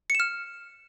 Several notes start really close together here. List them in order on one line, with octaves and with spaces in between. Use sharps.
C#7 E7 F6